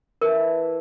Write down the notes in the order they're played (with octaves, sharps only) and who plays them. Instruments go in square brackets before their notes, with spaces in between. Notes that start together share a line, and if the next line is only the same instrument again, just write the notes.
[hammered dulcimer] E3 A5 [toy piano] A#4